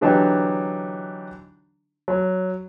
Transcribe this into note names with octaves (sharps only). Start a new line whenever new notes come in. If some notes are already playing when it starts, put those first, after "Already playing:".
D3 E3 F#3 D4 D#4 G4
F#3